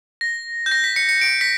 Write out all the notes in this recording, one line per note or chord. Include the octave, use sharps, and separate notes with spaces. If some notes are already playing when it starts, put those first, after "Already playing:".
A#6
G6
A#6
B6
C#7
C#7
D7
B6